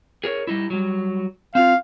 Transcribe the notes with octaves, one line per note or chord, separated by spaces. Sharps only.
G#4 A#4 C#5
G3 D#4 E4
F#3 G3
C4 F4 F5